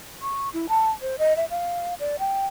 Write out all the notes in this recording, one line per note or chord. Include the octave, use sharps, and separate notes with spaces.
C#6
E4
A5
C5
D#5
E5
F5
D5
G5